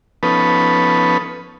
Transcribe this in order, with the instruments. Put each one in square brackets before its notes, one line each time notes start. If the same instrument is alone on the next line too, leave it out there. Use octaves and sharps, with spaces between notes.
[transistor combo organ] F3 B3 C#4 D#4 A4 B4